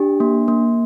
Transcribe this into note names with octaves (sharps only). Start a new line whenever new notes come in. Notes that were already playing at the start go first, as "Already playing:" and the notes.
Already playing: D4 G4
A#3
A#3